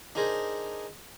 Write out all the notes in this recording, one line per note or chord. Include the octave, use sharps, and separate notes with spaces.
D4 D#4 G#4 A#4 C5